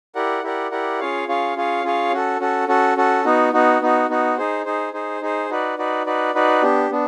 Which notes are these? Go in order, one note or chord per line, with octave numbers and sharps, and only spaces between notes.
E4 G4 A#4 D5 F#5
E4 G4 A#4 D5 F#5
E4 G4 A#4 D5 F#5
C#4 F4 G#4 C#5 F5
C#4 F4 G#4 C#5 F5
C#4 F4 G#4 C#5 F5
C#4 F4 G#4 C#5 F5
C#4 F#4 A4
C#4 F#4 A4
C#4 F#4 A4
C#4 F#4 A4
B3 D#4 F#4
B3 D#4 F#4
B3 D#4 F#4
B3 D#4 F#4
D#4 G#4 C5
D#4 G#4 C5
D#4 G#4 C5
D#4 G#4 C5
D#4 F#4 B4 D5
D#4 F#4 B4 D5
D#4 F#4 B4 D5
D#4 F#4 B4 D5
B3 D4 G4
B3 D4